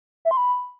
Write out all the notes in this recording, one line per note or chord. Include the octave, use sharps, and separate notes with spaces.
E5
C6
B5